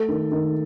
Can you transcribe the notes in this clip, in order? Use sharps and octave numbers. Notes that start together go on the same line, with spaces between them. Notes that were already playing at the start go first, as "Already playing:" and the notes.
Already playing: A3 A4
D#3
D#3